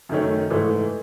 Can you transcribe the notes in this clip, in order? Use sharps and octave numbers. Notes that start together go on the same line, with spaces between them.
F#2 D#3 A3 C#4
G#2 E3 A3